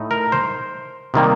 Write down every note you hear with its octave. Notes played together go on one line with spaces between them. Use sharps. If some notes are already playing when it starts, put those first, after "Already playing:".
Already playing: A2 A3 D#4
A#4
C5
C3 D#3 G3 A#3